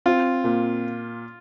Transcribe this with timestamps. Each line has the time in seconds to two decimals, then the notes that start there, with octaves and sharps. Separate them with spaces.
0.06 C4 F4
0.44 A#2